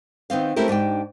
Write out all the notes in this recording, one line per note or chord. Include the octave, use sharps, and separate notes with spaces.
D#3 B3 C4 F5
A3 C4 C#4 E4 G4 A#4
G#2 D4 G4 G5